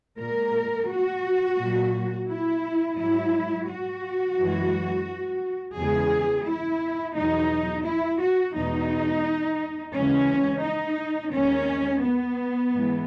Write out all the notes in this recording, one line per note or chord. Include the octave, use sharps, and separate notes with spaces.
A#2 G#3 A#4
F#4
A#2 F#3
E4
G#2 F#3 E4
F#4
F#2 E3 G#3
E2 C#3 E3 G#3 G#4
E4
E2 B2 F#3 D#4
E4
F#4
E2 B2 G#3 D#4
D#2 C#3 E3 G#3 C#4
D#4
D#2 D#3 G#3 C#4
B3
G#2 E3 G#3